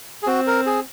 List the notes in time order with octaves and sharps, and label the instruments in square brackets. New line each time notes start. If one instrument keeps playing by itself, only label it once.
[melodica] G#4
[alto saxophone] C4 [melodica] F#4
[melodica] A#4
G#4